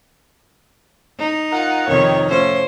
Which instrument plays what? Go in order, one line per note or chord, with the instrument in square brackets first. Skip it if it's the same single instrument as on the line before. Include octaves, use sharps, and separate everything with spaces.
[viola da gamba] D#4
[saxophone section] F4 A#4 F#5
[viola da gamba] F2 C3 C#5 [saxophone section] D#3
[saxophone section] A2 F3 C#4 [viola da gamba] C5